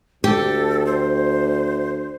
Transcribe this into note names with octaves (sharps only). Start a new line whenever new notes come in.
D2 G4 A4
C5